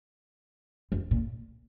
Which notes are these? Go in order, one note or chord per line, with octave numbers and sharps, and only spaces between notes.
F#2
A#2